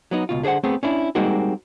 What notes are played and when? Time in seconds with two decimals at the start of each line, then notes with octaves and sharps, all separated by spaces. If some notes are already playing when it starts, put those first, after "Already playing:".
0.11 F#3 B3 D#4
0.29 C#2 B2 F4
0.43 D3 G#4 B4 C5 F#5
0.64 A3 B3 C4 G#4
0.83 C#4 D4 E4
1.15 G3 G#3 A#3 C4 D#4 F#4